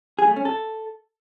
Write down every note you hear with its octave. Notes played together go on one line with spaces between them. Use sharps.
G#4
A3
C#4
A4